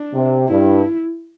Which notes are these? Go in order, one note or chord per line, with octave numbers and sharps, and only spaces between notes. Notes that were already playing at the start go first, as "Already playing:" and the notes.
Already playing: D4
C3
G2 E4